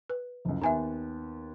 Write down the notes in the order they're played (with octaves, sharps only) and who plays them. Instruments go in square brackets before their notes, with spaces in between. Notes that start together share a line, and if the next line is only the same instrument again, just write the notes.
[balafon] B4
[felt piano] F#1 C#2
[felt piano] D#2 B3 [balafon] E5 G#5 A#5